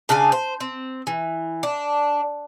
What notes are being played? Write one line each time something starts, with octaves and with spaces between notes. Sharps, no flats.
C#3 D4 F5 G#5
C5
C4
E3
D4